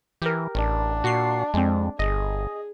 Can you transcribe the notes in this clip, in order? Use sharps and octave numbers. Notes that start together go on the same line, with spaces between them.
E3 G4 A#4
A1 D4
A#2 F#4 C#6 C7
F2 G#3 C4
G1 G#4 D#5